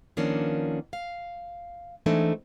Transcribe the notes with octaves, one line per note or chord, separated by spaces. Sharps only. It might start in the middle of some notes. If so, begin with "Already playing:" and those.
D#3 F3 A#3 B3 C#4 D4
F5
E3 G#3 A3 C4 D4 D#4